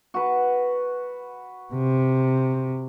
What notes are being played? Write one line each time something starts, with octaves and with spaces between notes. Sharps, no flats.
F#4 B4
C3